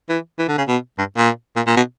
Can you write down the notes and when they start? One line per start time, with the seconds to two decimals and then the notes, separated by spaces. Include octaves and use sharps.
0.09 E3
0.39 E3
0.48 D3
0.58 C#3
0.68 B2
0.99 G2
1.17 A#2
1.57 A#2
1.67 A#2
1.77 B2